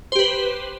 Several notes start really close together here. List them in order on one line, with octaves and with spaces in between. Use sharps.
C5 G4 B4